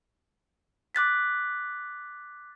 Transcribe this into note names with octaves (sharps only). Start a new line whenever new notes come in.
D6 F#6 A6 B6